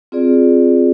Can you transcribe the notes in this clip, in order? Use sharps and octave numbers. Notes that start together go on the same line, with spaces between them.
C4 F4 G#4 D5